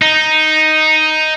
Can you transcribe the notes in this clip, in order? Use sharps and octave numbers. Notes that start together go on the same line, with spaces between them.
D#4